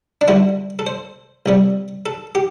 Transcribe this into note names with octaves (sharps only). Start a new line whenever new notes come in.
D4
E2 D3 G3 E4
A4
C5
C2 C3 G3
A4
G4